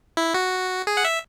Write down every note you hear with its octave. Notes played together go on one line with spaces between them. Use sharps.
E4
F#4
G#4
F#5
E5